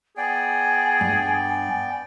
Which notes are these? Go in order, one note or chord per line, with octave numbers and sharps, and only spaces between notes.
B3 G#4 D5 G5 G#5
G2